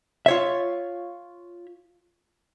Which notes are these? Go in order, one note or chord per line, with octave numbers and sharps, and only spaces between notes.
F4 C#5 E5